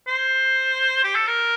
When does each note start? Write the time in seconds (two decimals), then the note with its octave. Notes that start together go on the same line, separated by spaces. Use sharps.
0.07 C5
1.04 G4
1.15 A4
1.27 A#4